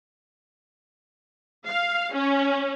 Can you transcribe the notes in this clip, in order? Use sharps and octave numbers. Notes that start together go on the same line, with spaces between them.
F5
C#4